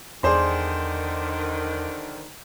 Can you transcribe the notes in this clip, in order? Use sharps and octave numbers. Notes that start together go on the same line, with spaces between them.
E2 D3 D#3 G#4 C5 D5 C6